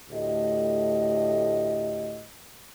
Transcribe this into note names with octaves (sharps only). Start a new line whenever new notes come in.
D2 A2 G4 D#5